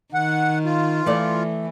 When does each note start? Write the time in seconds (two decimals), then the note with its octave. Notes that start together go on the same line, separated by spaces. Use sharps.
0.14 D#3 F#5
0.65 F4
1.06 E3 A3 D5